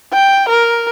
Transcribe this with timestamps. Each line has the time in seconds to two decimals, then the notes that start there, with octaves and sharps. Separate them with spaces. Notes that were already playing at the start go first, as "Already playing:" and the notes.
0.13 G5
0.49 A#4